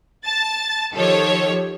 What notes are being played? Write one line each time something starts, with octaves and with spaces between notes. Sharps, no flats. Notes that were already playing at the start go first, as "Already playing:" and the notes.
A5 A6
D#3 F3 G4 A4 C#5